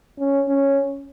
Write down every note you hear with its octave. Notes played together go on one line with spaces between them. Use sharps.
C#4
C#4